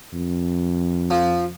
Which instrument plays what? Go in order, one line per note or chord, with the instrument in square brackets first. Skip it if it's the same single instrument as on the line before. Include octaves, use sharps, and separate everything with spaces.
[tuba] F2
[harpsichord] F3